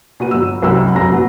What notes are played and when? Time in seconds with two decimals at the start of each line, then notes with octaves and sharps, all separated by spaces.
0.20 A#2 F#4 B4 D#7
0.31 G1 F#4 E6
0.62 F#1 C2 C3 F#4 G4 E6
0.95 F1 F#2 F#4 A#5 A#6
1.10 A#2 F#3 B3